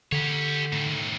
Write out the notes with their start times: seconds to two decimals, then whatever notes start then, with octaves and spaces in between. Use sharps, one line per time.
0.12 D3 G4 C#5
0.72 A2 D#3